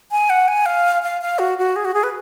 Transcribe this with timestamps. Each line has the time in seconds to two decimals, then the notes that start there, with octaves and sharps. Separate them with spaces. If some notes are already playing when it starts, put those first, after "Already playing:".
0.11 G#5
0.30 F#5
0.48 G#5
0.66 F5
1.03 F5
1.22 F5
1.39 F#4
1.58 F#4
1.76 G#4
1.85 F#4
1.94 G#4
2.03 B4